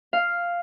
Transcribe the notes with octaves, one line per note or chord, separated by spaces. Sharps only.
F5